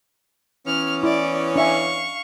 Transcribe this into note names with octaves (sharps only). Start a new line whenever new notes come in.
E3 B3 C#4 F6
E4 D5
D4 E5 F5 G#5 C#6